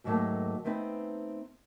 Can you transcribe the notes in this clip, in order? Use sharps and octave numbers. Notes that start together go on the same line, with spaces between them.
D#2 G#2 D#3 F#3 A3 A#3
A3 B3 C4 D#4 B4